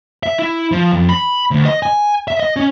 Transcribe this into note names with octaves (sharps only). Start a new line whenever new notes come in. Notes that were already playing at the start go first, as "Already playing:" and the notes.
E5
E4
F3
F2
B5
D2
D#5
G#5
E5
D#5
C#4